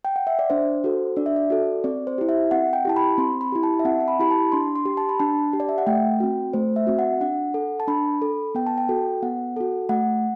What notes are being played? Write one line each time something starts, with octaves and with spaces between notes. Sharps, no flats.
G5
F#5
E5
D5
D4 C5
F#4 A4
D4 D5
E5
D5
F#4 A4
C4 D5
C5
E4 G4
E5
C4 F#5
G5
E4 G4 A5
B5
C4 C6
B5
E4 G4
A5
E5
C4 F#5
A5
B5
E4 G4 B5
A5
D4 C6
C6
G4
A5
B5
D4 A5
G4
D5
E5
F#5
A3 G5
C4 F#4
A3 C5
E5
C4 F#4
F#5
D4 F#5
A4
A5
D4 B5
A4
B3 G5
A5
G5
F#4 A4
B3 F#5
F#4 A4
A3 F#5